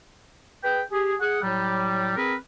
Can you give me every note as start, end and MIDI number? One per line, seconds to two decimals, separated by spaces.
0.63 0.81 68
0.63 0.81 71
0.63 0.81 79
0.91 1.15 67
0.91 1.15 68
1.21 1.40 68
1.21 1.40 78
1.42 2.14 45
1.42 2.14 54
1.42 2.14 55
2.17 2.35 60
2.17 2.35 68
2.17 2.35 70
2.17 2.35 71